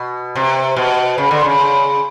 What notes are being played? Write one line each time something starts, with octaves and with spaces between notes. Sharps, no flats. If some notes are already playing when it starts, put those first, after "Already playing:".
Already playing: B2
C3
B2
C#3
D3
C#3